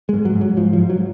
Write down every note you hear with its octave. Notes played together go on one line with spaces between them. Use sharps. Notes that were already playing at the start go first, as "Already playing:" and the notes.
G#3
G#2
F#3
G#2
F#3
G#2 F3
F3
G#2
F#3